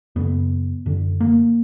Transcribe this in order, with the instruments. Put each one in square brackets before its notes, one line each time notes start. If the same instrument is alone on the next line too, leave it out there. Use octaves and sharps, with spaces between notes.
[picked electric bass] F#2 C#3 B3
F#2 D3
A#3